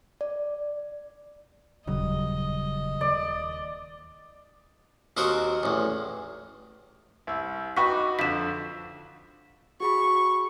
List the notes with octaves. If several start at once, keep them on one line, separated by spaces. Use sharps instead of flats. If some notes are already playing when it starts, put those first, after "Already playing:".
D5
D#1 F2 C#3 F#3 G3 D#5
D#2 D5
D#2 D#3 C4 F#4 A#4 F#5
A1 E2
C2 E5
D#4 F#4 B4 G5 C#6 B6
D6
F2 D3 B6 E7
F#4 G#4 B5 C#6